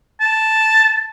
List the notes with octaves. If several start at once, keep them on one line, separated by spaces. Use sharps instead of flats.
A5